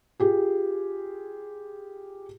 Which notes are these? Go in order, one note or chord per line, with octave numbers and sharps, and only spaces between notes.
F4 G4 G#4